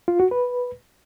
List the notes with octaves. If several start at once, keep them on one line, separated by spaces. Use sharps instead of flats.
F4
F#4
B4